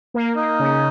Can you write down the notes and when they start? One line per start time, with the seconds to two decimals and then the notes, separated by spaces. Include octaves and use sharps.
0.14 A#3
0.36 A#3 D#4
0.59 C#3